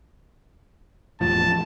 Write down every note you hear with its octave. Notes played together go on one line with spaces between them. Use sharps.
E1 A2 F3 A5